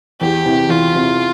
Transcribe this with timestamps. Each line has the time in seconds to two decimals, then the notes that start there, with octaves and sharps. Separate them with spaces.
0.21 E2 G4
0.45 C3 E3
0.69 E2 F4
0.94 C3 E3